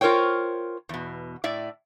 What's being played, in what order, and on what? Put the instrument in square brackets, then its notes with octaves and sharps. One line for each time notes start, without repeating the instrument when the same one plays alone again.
[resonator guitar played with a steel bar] F4 A#4 C5 C#5 G5
E2 B2
A2 D5 E5